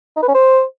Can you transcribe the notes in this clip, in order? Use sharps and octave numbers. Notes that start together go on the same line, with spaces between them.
D#4
B4
C#4
C5